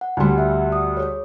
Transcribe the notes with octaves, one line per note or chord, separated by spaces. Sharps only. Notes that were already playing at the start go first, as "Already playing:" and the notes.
F#5
D2 G3 G#5 C6
E5 F#5
D#6
G#4 C#5